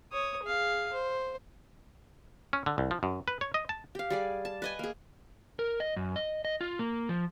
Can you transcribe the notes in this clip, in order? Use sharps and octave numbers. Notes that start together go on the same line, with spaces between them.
C#5 D#6
G#4 F5
C5
C#4
D3
C2
F3
F#2
B4
C#5
D#5
A5
G4 F5
G3 G#4 D5
A5
B4 D#5 G#5
A#3 G#4
A#4
D#5
F#2
D#5
D#5
F4
A#3
F3